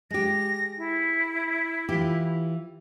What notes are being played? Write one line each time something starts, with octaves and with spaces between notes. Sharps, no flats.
G#3 G4 A#6
E4
E3 F4 G4